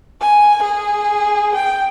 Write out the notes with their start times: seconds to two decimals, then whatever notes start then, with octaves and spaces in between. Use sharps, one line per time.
0.21 G#5
0.63 G#4
1.55 G5